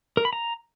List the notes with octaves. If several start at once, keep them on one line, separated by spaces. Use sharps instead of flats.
A#4
B5
A#5